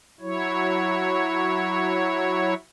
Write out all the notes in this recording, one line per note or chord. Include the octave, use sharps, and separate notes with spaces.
F#3 E4 C#5